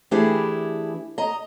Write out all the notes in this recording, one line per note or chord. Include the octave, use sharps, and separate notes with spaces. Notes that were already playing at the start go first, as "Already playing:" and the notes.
E3 A3 D4 E4 G4 G#4
D#5 A#5